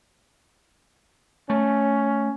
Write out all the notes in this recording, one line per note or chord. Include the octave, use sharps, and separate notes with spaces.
A3 C#4